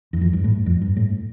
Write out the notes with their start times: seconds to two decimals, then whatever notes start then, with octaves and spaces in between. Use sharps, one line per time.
0.13 E2
0.21 F2
0.33 G2
0.44 A2
0.66 F2
0.82 G2
0.97 A2